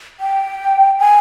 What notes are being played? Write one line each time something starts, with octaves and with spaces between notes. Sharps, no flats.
G5
G#5